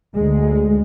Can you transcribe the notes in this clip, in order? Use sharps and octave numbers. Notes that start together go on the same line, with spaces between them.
D2 G#3